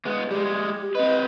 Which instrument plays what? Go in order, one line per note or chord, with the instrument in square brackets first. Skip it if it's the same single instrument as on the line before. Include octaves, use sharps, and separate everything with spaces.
[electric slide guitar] G#3 B3
[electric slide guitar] G3 G#3 [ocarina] G4
[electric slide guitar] C4 B4 [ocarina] D#5